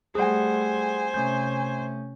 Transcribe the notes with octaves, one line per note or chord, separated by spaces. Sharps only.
G3 A3 G#4 C5 F#5 G#5
C3 A3 C#4 G6